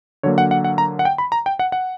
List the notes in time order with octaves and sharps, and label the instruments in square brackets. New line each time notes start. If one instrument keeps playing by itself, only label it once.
[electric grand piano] D3 F#3 A#3 C#5
F#5
F#5
F#5
A#5
F#5
G5
B5
A#5
G5
F#5
F#5